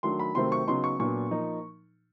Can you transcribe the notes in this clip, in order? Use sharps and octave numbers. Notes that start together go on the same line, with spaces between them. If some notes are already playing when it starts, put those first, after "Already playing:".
D#3 F#3 A3 D4 C6
B5
C3 D#3 F#3 A3 C4 C6
C#6
C#3 F#3 B3 D#4 C6
C#6
A#2 F#3 B3 D4 C#6
F3 A#3 D#4